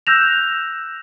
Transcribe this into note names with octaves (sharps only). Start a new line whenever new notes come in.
E6 F#6 G6 A#6 E7 F7